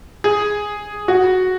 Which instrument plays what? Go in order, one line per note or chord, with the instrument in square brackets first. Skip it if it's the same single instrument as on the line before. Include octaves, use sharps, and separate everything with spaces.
[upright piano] G#4
F#4